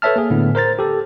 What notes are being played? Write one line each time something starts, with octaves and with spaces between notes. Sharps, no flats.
A4 B4 C#5 E5 A5 F6
A#3 G#4
A2 D3 B3
A#4 C5 A#5 A6
G4 A4